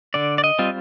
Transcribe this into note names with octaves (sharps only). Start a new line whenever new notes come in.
D3 D5
D5
D#5
G3 C4 F4